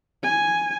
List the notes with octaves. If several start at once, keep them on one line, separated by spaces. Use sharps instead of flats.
G#5